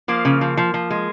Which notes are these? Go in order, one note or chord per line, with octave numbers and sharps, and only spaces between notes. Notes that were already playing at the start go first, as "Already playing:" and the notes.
F3 A#3
C#3
F3
F3
F3
G#3